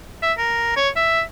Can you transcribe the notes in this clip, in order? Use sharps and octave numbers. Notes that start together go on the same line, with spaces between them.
E5
A#4
C#5
E5